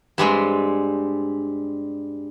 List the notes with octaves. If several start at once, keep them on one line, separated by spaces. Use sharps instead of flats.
G2 G3 G#3 C4